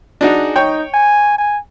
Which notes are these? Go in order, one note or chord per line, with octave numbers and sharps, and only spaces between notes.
D4 D#4 F#4 G#4
D#4 C#5 G5
G#5
G#5